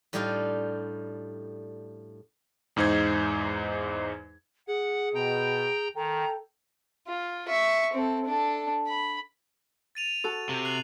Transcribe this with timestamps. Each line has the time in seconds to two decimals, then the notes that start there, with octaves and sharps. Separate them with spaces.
0.13 A2 G3 D4 D#4 F4 G5
2.76 E2 G#2 D#4 C5 G#6
4.68 G#4 F#5
5.14 B2 G5 A#5 G6
5.96 D#3 A4 G5 A#5
7.07 F4
7.48 E5 C#6
7.93 C4 A4
8.25 D4 A4
8.88 B5
9.95 A6 D#7 F7
10.24 F#4 A4
10.49 C3
10.65 F#6 C7 F#7